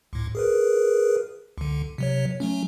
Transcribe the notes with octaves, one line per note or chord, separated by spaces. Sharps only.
C#2 A2
G#4 A#4 B4
C#2 D3
C3 F#3 C#5
F#3 A3 C#4